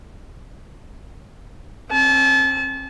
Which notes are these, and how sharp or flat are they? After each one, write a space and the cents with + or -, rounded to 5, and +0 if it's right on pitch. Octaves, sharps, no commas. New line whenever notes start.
C4 +40 A5 -35